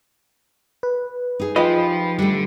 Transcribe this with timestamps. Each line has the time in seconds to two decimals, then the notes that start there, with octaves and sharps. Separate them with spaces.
0.83 B4
1.40 D#4 G#4
1.56 F3 F4 G4 B4 D#5 B5
2.19 D3 G3 A3